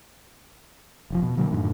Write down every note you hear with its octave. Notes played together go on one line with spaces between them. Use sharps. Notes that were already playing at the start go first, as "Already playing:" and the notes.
F1 G#2 F3
B2
B2 D3 F#3 A#3
F#2 A2 D3 D#3